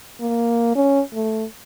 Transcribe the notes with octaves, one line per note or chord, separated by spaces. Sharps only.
A#3
C#4
A3